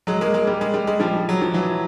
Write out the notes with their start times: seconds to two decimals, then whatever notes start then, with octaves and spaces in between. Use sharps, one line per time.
0.07 F#3 G#3
0.21 G#3 A#3
0.34 G#3 A#3
0.47 G3
0.61 G#3
0.74 G3
0.87 G#3
1.00 F3 G3
1.29 F#3
1.42 F3
1.54 E3 F#3